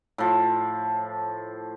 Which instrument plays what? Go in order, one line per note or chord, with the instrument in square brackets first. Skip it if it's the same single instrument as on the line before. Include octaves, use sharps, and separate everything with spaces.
[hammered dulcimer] A2 F3